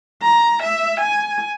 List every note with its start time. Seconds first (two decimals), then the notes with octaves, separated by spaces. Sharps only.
0.23 A#5
0.63 E5
1.00 G#5